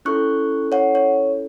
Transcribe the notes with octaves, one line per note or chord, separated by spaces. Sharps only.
C#4 E4 A4 C#6 F#6
C#5 F#5
C#5